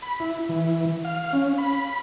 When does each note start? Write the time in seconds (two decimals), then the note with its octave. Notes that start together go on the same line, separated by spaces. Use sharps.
0.02 B5
0.20 E4
0.49 E3
1.05 F5
1.33 C#4
1.58 B5